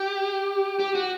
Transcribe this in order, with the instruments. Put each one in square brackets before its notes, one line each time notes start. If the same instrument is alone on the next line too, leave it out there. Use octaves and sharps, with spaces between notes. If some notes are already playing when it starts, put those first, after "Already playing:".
Already playing: [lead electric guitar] G4
G4
F#4